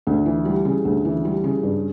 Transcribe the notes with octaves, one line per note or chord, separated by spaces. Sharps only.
D2
E3
G3
C#3
D2
E3
G3
C#3
G2